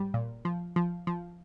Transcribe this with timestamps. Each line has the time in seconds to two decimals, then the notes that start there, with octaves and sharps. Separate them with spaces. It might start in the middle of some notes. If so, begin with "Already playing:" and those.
Already playing: G#2 G3
0.14 A#2
0.45 F3
0.76 F3
1.07 F3